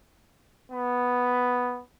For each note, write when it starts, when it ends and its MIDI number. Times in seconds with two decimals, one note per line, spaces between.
0.72 1.82 59